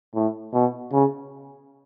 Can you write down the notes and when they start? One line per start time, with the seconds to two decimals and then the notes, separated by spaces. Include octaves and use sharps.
0.15 A2
0.53 B2
0.92 C#3